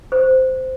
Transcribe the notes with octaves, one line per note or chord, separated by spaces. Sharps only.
C5